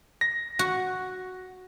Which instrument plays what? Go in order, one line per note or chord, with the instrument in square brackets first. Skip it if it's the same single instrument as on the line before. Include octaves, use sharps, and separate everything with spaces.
[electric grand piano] A#6
[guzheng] F#4